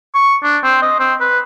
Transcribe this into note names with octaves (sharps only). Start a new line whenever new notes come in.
C#6
D4
C4
D#5
C4
B4